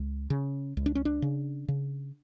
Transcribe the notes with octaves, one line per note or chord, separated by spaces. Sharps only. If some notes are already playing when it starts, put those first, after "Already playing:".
Already playing: C#2
C#3
C#2
D4
C#4
D4
C#3
C#3